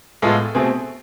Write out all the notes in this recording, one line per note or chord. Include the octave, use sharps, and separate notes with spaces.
A2 G#3 B3 F4 A4
B2 A3 C4 G#4